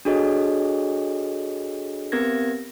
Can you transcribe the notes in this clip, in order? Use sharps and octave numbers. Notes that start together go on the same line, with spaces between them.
D4 F#4 G#4 A4 C#5 D#5
B3 C4 G4 A#4 G#6 A#6